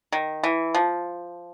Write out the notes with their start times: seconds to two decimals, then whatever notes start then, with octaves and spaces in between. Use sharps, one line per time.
0.12 D#3
0.43 E3
0.74 F3